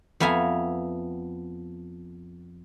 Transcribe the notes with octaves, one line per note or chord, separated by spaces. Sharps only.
F2 B3 E5 F5 G#5 A#5